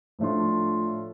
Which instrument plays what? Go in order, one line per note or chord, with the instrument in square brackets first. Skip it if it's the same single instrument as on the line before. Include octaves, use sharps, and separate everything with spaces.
[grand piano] A2 F3 A3 D4 F4